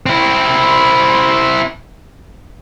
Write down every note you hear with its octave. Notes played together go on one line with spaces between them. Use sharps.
C4 E4